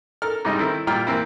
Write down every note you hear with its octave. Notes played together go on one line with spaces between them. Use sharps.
A4 A#4 F6
G#2 C3 G3 D#4 D#5
D#3 C4 E4 A4
A#2 G3 G5 F6
E3 A#3 C4 E4